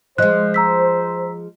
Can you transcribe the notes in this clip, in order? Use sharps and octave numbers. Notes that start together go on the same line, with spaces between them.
F3 G#3 C5 D#5 F#6
A#5 E6 B6